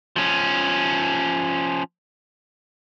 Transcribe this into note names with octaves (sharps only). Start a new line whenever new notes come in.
F3 C#4